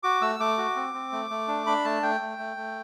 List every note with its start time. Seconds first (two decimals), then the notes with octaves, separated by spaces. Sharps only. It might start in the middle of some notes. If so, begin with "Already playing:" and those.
0.03 F#4 D6
0.21 A3 E6
0.40 A3 D6
0.58 F#4
0.76 C4
0.94 C4
1.12 A3
1.30 A3
1.48 D4
1.66 D4 B5
1.85 A3 A5
2.03 A3 G5
2.20 A3
2.38 A3
2.57 A3